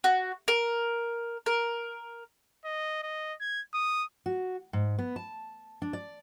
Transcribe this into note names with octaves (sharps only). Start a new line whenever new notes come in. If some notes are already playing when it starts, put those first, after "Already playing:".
F#4
A#4
A#4
D#5
D#5
G#6
D#6
F#4
G#2
B3
A5
D4
D5